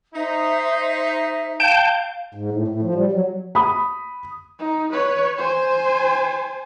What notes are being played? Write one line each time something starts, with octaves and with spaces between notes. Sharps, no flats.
D#4 C5 E5
F5 G5 A5 G6
G#2
A2
A2
F3
G3
F#3
B5 D#6
D#4
B4 C#5
C5 G#5